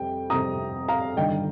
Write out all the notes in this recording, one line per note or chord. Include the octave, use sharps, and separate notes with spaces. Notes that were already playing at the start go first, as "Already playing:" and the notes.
Already playing: F2 C3 G3 C4 G5
F2 C3 G3 C4 A#5 D#6
F5 A#5
G1 G2 D#3 D#5 G5